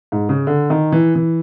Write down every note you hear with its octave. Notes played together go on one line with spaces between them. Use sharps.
G#2
C#3
D3
D#3
E3
E3